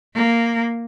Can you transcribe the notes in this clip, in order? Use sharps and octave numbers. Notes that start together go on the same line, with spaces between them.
A#3